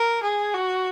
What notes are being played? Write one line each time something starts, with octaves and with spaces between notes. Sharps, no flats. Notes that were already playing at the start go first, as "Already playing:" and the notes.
Already playing: A#4
G#4
F#4